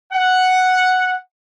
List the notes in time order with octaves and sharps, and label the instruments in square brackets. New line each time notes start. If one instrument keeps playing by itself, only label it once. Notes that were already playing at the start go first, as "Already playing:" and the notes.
[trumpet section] F#5